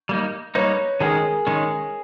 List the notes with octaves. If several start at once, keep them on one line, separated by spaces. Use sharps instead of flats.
G3 A#3 D#4
G3 A#3 D#4 B4 C#5
D#3 G#3 C#4 G#4 A#4
D#3 G#3 C#4